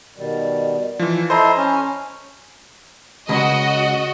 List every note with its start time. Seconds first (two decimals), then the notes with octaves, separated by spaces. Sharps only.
0.17 B2 D#3 G3
0.99 E3 F3
1.30 E4 A4 C5 D#5 A#5 C6
1.57 C#4
3.29 C#2 F#4 D#5